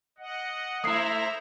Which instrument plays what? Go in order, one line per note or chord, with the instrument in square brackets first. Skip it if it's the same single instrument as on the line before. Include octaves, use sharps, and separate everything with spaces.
[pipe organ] D#5 F#5
[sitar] A3 E4 [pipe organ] C5 E5 A#5 [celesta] D#6 C7